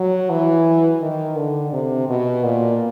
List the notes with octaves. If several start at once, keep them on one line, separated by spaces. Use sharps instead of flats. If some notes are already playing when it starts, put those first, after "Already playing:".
Already playing: F#3
E3
D#3
D3
C3
B2
A#2